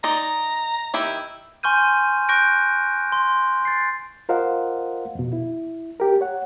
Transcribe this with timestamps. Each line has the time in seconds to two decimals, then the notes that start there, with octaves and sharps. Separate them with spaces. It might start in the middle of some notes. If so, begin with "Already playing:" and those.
0.04 D#4 D5 A#5
0.94 D#3 E4 G4
1.63 G#5 C6 C#6 F6 G6 D#7
2.29 C#6 F#6 G6 A#6 D7
3.12 C6
3.65 A6 C7
4.29 F4 A#4 C5 D#5 F5 F#5
5.15 F2 B2
5.33 E4
6.00 G4 A#4
6.21 C#5 F#5